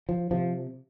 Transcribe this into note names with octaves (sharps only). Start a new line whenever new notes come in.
F3
C3 F3